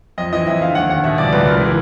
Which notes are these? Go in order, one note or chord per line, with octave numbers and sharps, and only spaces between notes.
F2 D#5
E3 D#5
F2 E5
D3 F5
D#2 F#5
D#2 F#5
B2 E5
C#2 D5
C#2 B4
C#2 A#4
E3